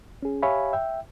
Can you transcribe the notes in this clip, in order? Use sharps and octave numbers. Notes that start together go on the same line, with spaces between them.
C#4 G#4
G4 C#5 E5 F5 G#5 B5
E5 G5